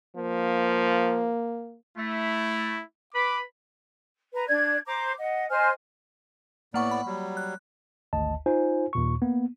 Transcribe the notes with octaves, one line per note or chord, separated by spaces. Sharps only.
F3 A#3
A3 E4
B4 B5 D6
B4 A#5
D4 D5 G#6
C5 A#5 D6
D#5 F#5
C5 D#5 G#5 F6
A2 A#3 B3 D5 F#5 C#6
B5
F#3 G3
F#6
G#1 D2 D#5 A5
D#4 F4 C5 G#5
D#2 A#2 C#6
A#3 B3